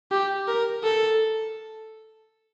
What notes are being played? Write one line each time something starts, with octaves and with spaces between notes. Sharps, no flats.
G4
A#4
A4